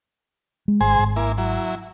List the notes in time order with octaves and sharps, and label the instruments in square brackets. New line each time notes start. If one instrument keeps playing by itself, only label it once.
[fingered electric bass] G#3
[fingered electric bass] G#1 [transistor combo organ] G#4 C5 G#5
[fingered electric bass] G#1
[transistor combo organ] A#3 E4
F#3 E4